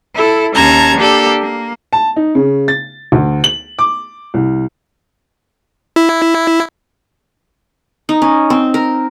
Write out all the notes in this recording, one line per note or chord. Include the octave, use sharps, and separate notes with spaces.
E4 A4
D#2 C#4 A5 A#5 G#6
A#3 D4 G4 A4
A#3
A5
D#4
C#3
A6
D2
F#7
D6
C2
E4
D#4
C#4
C4
A#4